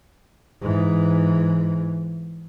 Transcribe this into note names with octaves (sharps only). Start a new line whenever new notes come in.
G#2 E3